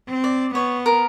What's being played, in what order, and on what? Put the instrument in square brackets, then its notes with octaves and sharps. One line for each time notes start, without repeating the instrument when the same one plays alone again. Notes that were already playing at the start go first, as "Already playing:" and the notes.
[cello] C4
[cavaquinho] D5
[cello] B3 [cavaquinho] C#5
[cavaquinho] A#4